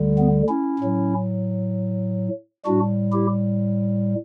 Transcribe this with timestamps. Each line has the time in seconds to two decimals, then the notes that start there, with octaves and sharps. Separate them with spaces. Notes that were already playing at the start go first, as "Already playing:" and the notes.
Already playing: D2 D3 G3
0.18 B3
0.49 C#4 E4
0.79 A2 F#3
2.66 A2 G3 D4 F#4
3.12 E4 G4